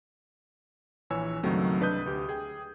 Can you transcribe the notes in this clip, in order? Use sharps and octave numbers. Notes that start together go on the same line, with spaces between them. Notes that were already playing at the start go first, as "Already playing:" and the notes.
A#1 E3 C#5 G#5 E6
C#2 G2 D#3 F#3 A3 C4
C2 D4 B4 D#5 D#6 G6
D2 G4
G#4 G5